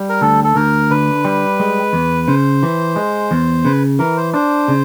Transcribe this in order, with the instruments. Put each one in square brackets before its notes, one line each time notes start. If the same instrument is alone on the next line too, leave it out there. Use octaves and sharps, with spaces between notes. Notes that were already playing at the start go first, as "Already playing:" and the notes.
Already playing: [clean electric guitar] G3
[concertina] A#4
[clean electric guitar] D2 [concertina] A4
[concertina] A4
[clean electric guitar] D2 [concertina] A#4
[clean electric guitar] D3 [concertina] B4
[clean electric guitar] G3
G#3
E2
[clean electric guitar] C#3 [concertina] C5
[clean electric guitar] E3
G#3
E2
[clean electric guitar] C#3 [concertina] B4
[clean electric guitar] E3 [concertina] A#4
[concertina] C5
[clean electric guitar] D4 [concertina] C5
[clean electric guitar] C#3